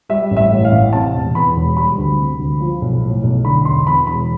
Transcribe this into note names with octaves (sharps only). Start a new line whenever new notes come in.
G3 E5
A1
E5
A2
F5
A1
C3 A5
E1
E2 B5
E1
G3 B5
D2
C3
D2
F3
B1
A2
B1
D3 B5
E1 C6
E2 B5
E1 B5